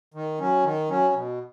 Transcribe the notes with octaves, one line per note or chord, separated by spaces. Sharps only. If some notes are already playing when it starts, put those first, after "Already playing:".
D#3
F#3 C#4
D#3
F#3 C#4
B2